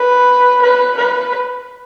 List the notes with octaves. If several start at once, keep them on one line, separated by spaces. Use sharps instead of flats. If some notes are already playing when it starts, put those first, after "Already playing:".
Already playing: B4
B4
B4